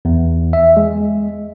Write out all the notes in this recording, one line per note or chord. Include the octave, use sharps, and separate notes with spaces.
E2
E5
G#3